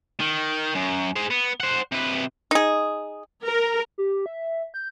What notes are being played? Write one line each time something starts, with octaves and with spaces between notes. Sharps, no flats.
D#3
F#2
G#4 C5
B3
C5 F#5
C3 B4
D#4 G#4
A#4
G4
E5
G6